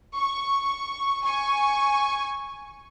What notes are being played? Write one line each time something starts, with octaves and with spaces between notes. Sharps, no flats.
C#6
G#5 C#6